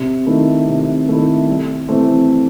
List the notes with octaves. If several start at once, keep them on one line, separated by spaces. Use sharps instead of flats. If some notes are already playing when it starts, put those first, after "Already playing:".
Already playing: C3
D#3 A3 E4
C3
D#3 A3 E4
C2
C3 E3 A3 C4